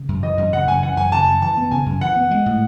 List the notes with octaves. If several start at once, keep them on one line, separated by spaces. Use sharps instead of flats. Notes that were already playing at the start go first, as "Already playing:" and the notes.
Already playing: C#3
F#2
E3 D#5
F#2 D#5
C#3 F#5
F#2 G#5
E3 F#5
F#2 G#5
C#3 A5
F#2
E3 A5
B3
C#3 G#5
F#2
E3 F#5
B3
G#3
A2